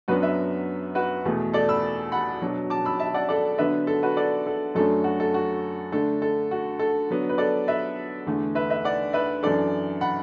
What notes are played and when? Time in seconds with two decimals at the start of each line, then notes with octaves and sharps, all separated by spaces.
0.08 F#2 F#3 B3 D4 F#4 B4
0.22 B4 E5
0.95 F#4 B4
1.25 E2 B2 A3
1.53 A4 D5
1.69 B5 E6
2.12 F#5 B5
2.42 B2 F#3 D4
2.70 A5 D6
2.85 B5 E6
3.00 E5 A5
3.14 D5 F#5
3.29 A4 D5
3.58 D3 F#3 B3 D4 B4 E5
3.87 A4
4.03 F#4 B4
4.17 A4 D5
4.47 A4
4.75 F#2 F#3 A3 D4 A4
5.04 F#4
5.20 A4
5.34 F#4
5.92 D3 A3 D4 A4
6.22 A4
6.51 F#4
6.79 A4
7.10 D3 F#3 B3 D4
7.29 B4
7.38 A4 D5
7.68 B4 E5
8.26 E2 D3 A3
8.55 B4 E5
8.70 B4 E5
8.85 D5 F#5
9.13 B4 E5
9.43 F#2 E3 D4 A4 D5
10.01 F#5 B5